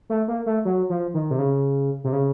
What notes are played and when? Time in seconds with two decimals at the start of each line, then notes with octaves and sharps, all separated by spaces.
0.10 A3
0.28 A#3
0.46 A3
0.65 F#3
0.90 F3
1.14 D#3
1.31 C3
1.39 C#3
2.04 C3
2.12 C#3